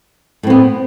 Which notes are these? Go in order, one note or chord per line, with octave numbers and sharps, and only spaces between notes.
A2 B3 C4